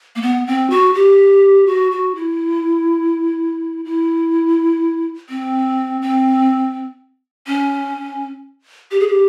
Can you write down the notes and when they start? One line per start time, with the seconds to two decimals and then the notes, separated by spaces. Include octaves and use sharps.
0.16 A#3
0.22 B3
0.47 C4
0.70 F#4
0.94 G4
1.67 F#4
1.92 F#4
2.15 E4
3.85 E4
5.29 C4
6.02 C4
7.47 C#4
8.91 G4
9.00 G#4
9.08 G4